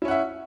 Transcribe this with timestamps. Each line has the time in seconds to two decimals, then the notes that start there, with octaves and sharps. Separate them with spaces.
0.02 E4
0.05 C#4
0.08 F#5
0.11 E5